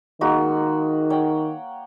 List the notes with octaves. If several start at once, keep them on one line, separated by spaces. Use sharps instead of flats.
D#3 G#3 A#3 F#4
C#5 F#5 G5